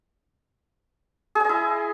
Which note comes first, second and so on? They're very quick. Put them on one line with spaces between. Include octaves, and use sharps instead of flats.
G#4 G#5 D#5 E4